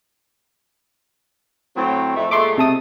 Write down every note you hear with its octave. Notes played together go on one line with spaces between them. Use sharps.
A2 F#3 C4
F2 A3
A#2 G#3 A3 C6 D6
C3 A5 D#6